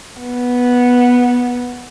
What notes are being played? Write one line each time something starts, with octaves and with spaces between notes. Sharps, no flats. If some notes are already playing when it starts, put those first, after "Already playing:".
B3